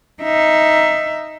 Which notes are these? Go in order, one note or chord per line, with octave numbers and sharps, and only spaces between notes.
D#4 E5